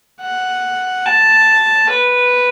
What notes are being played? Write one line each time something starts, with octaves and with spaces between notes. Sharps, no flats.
F#5
A5
B4